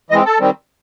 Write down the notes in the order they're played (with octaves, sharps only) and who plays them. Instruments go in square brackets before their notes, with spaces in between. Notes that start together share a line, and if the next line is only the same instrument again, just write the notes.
[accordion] E3 G#3 C4 D#5
A4
D#3 G3 C4